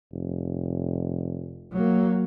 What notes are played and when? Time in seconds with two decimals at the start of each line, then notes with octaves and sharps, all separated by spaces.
0.12 F1
1.72 F#3 A#3